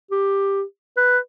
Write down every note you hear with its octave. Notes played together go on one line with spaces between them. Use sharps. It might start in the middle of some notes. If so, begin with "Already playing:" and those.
G4
B4